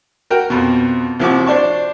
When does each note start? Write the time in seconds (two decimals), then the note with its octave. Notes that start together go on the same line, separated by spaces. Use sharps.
0.30 F#4 A#4 G5
0.50 F2 B2
1.20 C2 C3 F3 F#4 C#6 D6
1.46 D4 C5 D5 A5 C#6